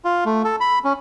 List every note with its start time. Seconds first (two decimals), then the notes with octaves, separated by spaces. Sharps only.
0.05 F4
0.26 A3
0.44 A4
0.60 B5
0.84 C#4